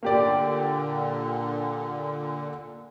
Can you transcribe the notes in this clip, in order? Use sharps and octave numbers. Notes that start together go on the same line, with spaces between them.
A#2 D3 A#3 G4 D5